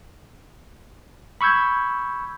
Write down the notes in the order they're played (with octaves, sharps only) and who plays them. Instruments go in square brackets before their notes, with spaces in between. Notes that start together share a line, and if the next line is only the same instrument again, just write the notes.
[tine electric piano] B5 C#6 E6 G6 G#6